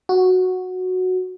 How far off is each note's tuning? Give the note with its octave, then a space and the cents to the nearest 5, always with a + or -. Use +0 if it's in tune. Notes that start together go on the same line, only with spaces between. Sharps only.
F#4 -5